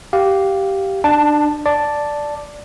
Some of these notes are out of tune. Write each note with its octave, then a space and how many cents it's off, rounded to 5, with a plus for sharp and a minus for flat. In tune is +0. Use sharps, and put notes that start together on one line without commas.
G4 -10 F5 +0
D4 +25 A5 +0
D5 +0 A5 +0